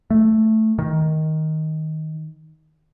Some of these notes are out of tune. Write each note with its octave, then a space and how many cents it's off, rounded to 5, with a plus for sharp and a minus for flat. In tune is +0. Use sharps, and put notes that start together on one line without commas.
A3 +0
D#3 +10